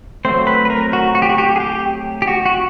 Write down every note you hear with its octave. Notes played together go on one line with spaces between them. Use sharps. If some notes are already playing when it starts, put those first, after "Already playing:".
F#3 A3 C4 C5
B4
B4
A#4
F#4
F#4
G4
F#4
G4
G#4
G4
G4
F#4
F#4